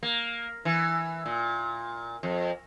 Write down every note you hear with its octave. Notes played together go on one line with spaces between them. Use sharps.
A#3
E3
A#2
F2